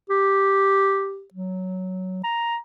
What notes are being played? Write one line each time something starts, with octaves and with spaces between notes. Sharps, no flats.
G4
F#3
A#5